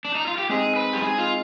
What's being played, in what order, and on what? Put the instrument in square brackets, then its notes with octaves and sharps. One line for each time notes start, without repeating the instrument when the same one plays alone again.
[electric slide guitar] D4
D#4
F4
G4
[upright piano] G#3 C4 D#4 [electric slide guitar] G#4
[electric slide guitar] B4
G4
[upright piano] G#3 C4 D#4 [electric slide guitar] G#4
[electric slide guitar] F4